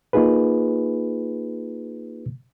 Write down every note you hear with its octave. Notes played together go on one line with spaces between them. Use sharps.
A#3 D#4 F4 G#4 B4